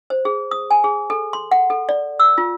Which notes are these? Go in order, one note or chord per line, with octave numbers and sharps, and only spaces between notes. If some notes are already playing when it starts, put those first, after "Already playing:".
C5
G#4
D#6
G#5
G#4
A4
C6
F#5
A4
D5
E6
F4